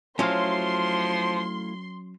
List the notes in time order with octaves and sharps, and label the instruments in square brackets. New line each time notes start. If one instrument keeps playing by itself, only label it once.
[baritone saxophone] F3 [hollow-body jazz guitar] F#3 C#4 [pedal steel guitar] A3 E4 F5 [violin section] C6